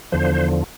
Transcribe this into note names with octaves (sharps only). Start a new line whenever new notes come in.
E2 D3 F3 C5